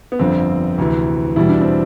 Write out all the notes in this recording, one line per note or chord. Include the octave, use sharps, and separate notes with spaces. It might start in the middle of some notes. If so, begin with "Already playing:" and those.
B3
G1 F2 D3 C4
D2 C3 E3
E2 B2 G3 E4
D4
C4